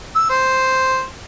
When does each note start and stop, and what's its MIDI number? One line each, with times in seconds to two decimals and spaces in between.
0.16 0.27 88
0.30 1.03 72